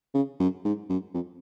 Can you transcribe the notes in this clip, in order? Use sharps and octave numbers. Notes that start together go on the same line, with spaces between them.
C#3
F#2
G#2
F#2
F2